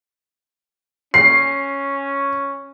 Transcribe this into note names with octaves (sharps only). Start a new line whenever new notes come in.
C#4 C7